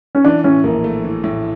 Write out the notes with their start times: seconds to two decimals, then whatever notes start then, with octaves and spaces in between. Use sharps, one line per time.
0.15 C#4
0.24 E3 D4
0.44 A2 C#4
0.64 A#1 A#3
0.84 A3
1.04 E3
1.24 A2